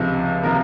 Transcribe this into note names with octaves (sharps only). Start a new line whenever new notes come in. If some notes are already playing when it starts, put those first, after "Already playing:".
Already playing: C#2 C3 F3
C3 F3 A#3 A#4